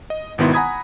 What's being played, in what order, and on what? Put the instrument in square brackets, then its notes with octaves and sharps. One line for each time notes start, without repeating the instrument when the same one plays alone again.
[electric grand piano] D#5
G#1 B2 D#3 B3 E4 C6
F#5 G#5 A#5 B5 D#6 G#6